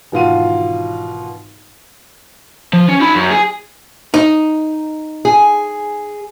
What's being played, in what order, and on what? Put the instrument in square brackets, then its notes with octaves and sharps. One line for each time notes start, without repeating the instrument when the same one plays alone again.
[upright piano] G#1 B2 E3 F4 F#5 D#7
[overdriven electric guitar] F3
C#4
D#4 B5
F#2
G#4
[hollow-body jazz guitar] D#4
[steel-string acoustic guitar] G#4